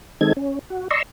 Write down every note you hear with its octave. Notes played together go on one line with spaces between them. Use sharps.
D#3 G#3 C4 D#4 A4 G#6
C#4
F#4
D5 D#5 A#5 C6 C#6 E6